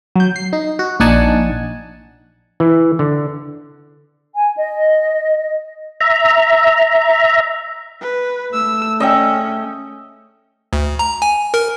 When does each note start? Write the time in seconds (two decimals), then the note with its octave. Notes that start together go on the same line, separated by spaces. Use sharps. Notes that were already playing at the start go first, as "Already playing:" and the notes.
0.16 F#3 G6
0.36 C7
0.53 D#4
0.79 F#4
1.00 A#1 D4 D#4 F#5 G#5 A5
2.60 E3
2.99 D3
4.36 G#5
4.58 D#5
6.01 E5 A#5
8.01 B4
8.54 A3 E6
9.00 C#4 D#5 E5 G5
10.73 D2
10.99 A#5
11.22 G#5
11.54 A#4